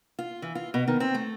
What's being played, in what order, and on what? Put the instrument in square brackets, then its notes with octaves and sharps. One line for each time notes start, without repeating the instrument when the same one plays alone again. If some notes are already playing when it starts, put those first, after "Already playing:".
[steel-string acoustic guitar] F4
E3
F4
B2
D#3
C4
A3